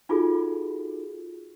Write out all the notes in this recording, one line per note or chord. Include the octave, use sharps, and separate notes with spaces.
D#4 F4 F#4 G#4 A4